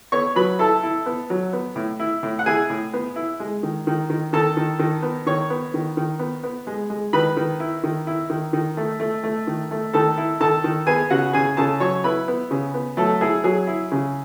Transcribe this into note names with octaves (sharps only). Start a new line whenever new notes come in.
B3 C#5 C#6
F#3 B4 B5
E4 A4 A5
E4
B3
F#3
B3
A2
E4
A2
F#5
E4 G#4 G#5
A2
B3
E4
G#3
D#3
D#3
D#3
D#3 A4 A5
D#3
D#3
B3
D#3 C#5 C#6
B3
D#3
D#3
B3
B3
G#3
G#3
D#3 B4 B5
D#3
E4
D#3
E4
D#3
D#3
A3
A3
A3
D#3
A3
D#3 A4 A5
E4
D#3 A4 A5
D#3
B3 G#4 G#5
C#3 F#4 F#5
C#3 G#4 G#5
C#3 A4 A5
F#3 C#5 C#6
E4 B4 B5
B3
C#3
B3
F#3 A3 A4
E4 G#4
F#3 G#4
E4
C#3